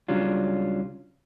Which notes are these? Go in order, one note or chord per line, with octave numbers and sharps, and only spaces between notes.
C#2 F#3 G3 C#4 D4 F4